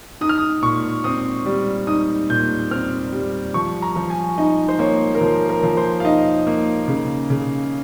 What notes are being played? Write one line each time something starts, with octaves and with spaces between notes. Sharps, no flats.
D#4 D#6
F6
D#6
A#2 C#6
C4 D#6
G3
D#4 D#6
A#2 G6
C4 F6
G3
F3 C#6
A#5
F3
G#5
D#4 D#5
C5
A#3 C#5
A#4
F3 C5
A#4
F3
C5
F5
D#4 D#5
A#3
C#3
C#3